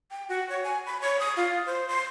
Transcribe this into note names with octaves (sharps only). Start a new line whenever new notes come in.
G5
F#4
C#5
G#5
B5
C#5
D#6
F4
C5
C6